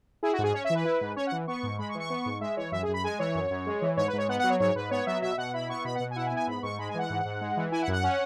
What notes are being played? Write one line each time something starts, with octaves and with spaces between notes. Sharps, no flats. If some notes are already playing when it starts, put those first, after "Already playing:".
E4 G#4
F#4
G#2 G#4
C#4 C#5
E5
E3
B4
E4
G#2
C#4 C#5
F#5
E3
B3 C#6
G#2
G#3 B5
C#6
E3
C#6
B3
G#2
G#3 E5
E3 C#5
F#2 E5
G#4
F#2
B5
G#3 G#5
E3 C#5
F#2
F#2
G#3
E3
G#2 C#5
B4
G#2 C#5
B3 F#5
F#5
F#3
C#5
G#2 C#5
G#2 B4
B3 C#5
F#3 E5
B2 E5
B2 F#5
E4 B5
B3 C#6
B2 B5
F#5
B2
G#5
E4 F#5
G#5
B3
G#5
G#2 B5
G#2 C#6
G#3 B5
G#5
E3 F#5
G#2
G#2
G#3
E3
E4 G#5
F#5
F#2
F#5
C#4